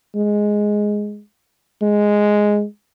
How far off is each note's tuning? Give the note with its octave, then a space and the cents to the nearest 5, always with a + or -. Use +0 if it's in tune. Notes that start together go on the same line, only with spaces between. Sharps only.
G#3 +0
G#3 +0